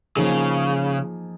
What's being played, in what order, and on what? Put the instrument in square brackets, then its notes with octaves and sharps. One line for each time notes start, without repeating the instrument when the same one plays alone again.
[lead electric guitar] C#3 [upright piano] F3 A#3 D#4 G#4